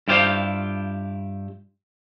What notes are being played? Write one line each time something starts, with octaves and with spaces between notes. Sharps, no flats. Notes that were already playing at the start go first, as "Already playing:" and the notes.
G2 E4 F4 G4 C5 F5